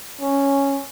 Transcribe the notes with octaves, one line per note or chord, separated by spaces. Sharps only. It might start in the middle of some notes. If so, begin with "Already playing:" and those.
C#4